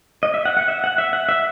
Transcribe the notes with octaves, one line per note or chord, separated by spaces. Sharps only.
D#5
E5
F#5
F#5
E5
F#5
E5
F#5
E5